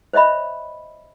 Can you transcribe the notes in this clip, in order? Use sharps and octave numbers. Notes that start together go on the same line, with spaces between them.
C5 C#5 D#5 E5 B5